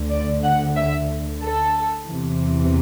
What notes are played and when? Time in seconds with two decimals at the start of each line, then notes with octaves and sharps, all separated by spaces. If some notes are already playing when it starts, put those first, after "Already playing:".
Already playing: D2 D3
0.10 D5
0.43 F#5
0.76 E5
1.42 A4
2.08 E2 C3 E3